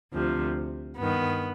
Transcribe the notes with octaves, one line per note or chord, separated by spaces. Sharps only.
D2 C3 F3
G2 D#3 B3